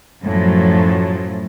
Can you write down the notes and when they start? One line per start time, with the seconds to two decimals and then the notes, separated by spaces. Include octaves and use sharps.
0.22 F#2 A2 F3 F#3